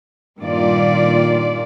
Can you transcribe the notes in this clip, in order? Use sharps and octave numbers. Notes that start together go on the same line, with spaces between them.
G2 A#2 D#3 F4 D5